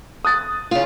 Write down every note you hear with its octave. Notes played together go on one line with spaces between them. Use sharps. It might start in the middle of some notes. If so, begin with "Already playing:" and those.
D#6 F#6 A6
C#3 F4